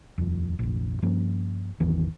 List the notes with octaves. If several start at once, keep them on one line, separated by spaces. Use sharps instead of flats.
D#1 F2
F1 A#1
G2 F3 A#3 C#4
G#1 E2 D#3 E3